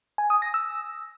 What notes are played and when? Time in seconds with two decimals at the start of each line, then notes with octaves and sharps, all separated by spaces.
0.18 G#5
0.30 D#6
0.42 A#6
0.54 E6